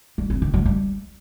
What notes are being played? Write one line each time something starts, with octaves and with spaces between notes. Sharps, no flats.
G3
C4
D#3
F#3
G3